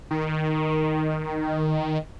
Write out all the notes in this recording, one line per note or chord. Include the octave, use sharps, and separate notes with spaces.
D#3